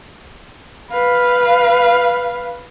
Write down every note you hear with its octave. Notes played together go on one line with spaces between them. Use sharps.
B4 F5